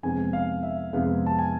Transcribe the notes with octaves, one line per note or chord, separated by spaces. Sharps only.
F2 C3 G#3 B3 G#5
F5
E5
F2 C3 G#3 B3 F5
A5
G#5